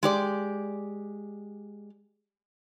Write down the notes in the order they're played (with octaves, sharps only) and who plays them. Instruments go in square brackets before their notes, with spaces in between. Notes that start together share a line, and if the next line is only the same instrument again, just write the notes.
[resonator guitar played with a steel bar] G#3 G4 D5